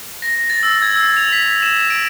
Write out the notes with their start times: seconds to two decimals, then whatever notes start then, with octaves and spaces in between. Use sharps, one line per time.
0.22 A#6
0.50 A6
0.63 E6
0.82 G#6
0.96 E6
1.17 F7
1.32 B6
1.63 E7
1.90 D7